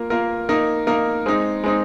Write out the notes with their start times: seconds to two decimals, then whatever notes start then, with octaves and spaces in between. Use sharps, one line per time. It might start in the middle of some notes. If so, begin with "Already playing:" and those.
Already playing: A#3 F4 A#4
0.10 A#3 F4 A#4
0.49 A#3 D#4 A#4
0.87 A#3 D#4 A#4
1.26 G#3 C4 D#4
1.64 G#3 C4 D#4